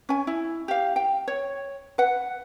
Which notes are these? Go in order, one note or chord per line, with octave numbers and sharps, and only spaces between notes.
C#4 G#5
E4
G4 F5
G5
C#5
B4 F#5